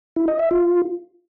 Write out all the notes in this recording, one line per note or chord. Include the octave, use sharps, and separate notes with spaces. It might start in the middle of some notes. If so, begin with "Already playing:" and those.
E4
D#5
E5
F4